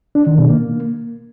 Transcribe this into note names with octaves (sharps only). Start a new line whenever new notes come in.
D4
D#3
B2
A#3